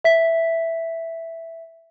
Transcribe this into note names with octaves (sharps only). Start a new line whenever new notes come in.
E5 B6